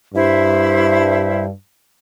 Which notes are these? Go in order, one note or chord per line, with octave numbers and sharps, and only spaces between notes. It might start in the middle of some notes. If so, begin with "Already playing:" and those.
G2 E4 C5 E5